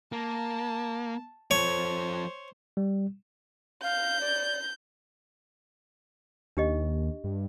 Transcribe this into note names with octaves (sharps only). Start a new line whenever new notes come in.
A#3 A5
F3 A4 C5 C#5
G3
F5 G6
D5
D#2 D4 G4 D#5
G2